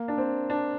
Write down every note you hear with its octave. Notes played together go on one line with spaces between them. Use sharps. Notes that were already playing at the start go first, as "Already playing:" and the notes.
Already playing: A#3
D4
C4
D4